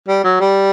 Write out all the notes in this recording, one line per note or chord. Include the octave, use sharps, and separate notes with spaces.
G3
F#3
G3